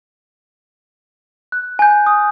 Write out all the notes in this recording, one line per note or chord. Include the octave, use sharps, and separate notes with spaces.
F#6
G#5 G6
D#6